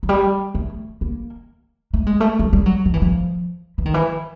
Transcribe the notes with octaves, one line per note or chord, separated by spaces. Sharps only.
F#3
G3
A3
A#3
A3
G#3
A3
F#3
G3
F#3
F3
E3
F3
E3
D#3
E3